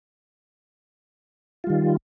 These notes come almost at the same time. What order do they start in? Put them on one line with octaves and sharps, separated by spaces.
F4 G3 D#3